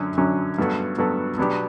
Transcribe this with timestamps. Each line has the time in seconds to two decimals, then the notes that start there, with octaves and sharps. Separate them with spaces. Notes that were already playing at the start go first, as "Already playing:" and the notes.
Already playing: F#2 D3 F#3 C#4
0.17 F#2 D3 F#3 C#4
0.58 G2 F#3 B3 F#4 A4
0.98 G2 F#3 B3 F#4 A4
1.38 B2 F#3 B3 D4 G4